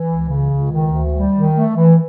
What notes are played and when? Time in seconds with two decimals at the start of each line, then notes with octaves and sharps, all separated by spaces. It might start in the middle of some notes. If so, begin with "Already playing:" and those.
Already playing: E3
0.08 C#2
0.29 C#3
0.50 C#2
0.70 D#3
0.92 D2
1.13 G3
1.34 D#3
1.54 A3
1.75 E3